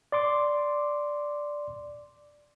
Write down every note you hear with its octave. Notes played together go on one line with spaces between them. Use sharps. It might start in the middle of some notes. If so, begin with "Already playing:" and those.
D5 C6 D6